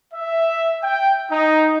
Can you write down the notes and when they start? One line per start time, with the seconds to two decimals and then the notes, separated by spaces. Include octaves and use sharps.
0.14 E5
0.83 G5
1.31 D#4